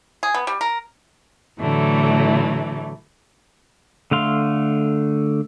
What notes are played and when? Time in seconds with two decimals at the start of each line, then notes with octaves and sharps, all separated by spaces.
0.23 G#4
0.34 B3
0.47 G3
0.61 A#4
1.60 A2 D3 E3 F#3 A3
4.11 D3 A3 F5 C6